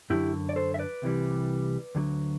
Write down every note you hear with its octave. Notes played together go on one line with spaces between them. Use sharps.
F#2 D3 F#3 E4 G4
D5
A4 C5
E5
B4 D5
C2 C3 E3 G3
D2 D3 F#3